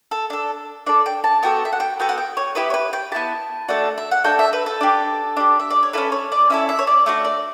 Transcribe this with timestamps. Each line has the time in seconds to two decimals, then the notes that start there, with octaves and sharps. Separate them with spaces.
0.11 A4
0.30 D4 A4
0.86 D4 A4 D5
1.06 G5
1.24 A5
1.43 B3 F#4 A4 G5
1.65 E5
1.72 F#5
1.80 G5
2.00 B3 F#4 A4 G5
2.09 F#5
2.18 G5
2.37 C#5
2.55 B3 E4 G4 B4
2.70 C#5
2.74 B4
2.93 G5
3.12 B3 E4 G4 A5
3.68 A3 D4 F#4 A4
3.98 E5
4.11 F#5
4.24 A3 D4 F#4 A4 G5
4.39 E5
4.53 B4
4.66 A4
4.81 D4 G4
5.37 D4 G4
5.59 E5
5.71 D5
5.83 C#5
5.93 E4 A4 B4
5.97 C#4
6.12 C#5
6.32 D5
6.50 C#4 E4 A4 E5
6.69 E5
6.79 C#5
6.87 D5
7.06 A3 D4 F#4 D5
7.25 D5